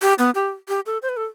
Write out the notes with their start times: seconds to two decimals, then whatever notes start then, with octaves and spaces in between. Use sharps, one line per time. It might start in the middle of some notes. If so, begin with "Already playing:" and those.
0.02 G4
0.19 B3
0.35 G4
0.68 G4
0.86 A4
1.02 C5
1.09 B4
1.17 A4